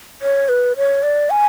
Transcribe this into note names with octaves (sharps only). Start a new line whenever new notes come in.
C#5
B4
C#5
D5
G#5